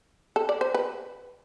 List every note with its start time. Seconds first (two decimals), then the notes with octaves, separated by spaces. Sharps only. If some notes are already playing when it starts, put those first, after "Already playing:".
0.36 A4
0.49 D5
0.61 C5
0.74 B4